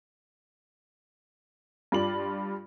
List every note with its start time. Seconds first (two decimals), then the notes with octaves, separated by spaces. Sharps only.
1.92 G2 F4 D5 F#7